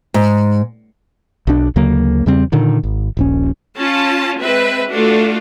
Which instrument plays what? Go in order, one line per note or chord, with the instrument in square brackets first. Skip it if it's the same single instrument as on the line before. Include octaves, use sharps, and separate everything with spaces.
[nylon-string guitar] G#2
[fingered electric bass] B1 D4
D2 C#3 F#3 A#3
E2 C#3 G3 C4
A#2 D3 D#3
G#1
D#1 A#1 C#4
[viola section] C#4 F4 A5
G#3 C4 B4 E5
A3 D4 F4 F#4 A4